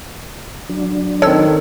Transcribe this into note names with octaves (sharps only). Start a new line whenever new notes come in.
F#3 D4
D#3 C4 A4 C#5 E6